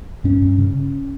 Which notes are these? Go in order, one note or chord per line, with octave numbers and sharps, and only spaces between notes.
G2 C#4
G2
C#3